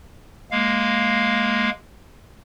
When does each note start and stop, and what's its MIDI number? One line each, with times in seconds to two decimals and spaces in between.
0.51 1.70 56
0.51 1.70 58
0.51 1.70 77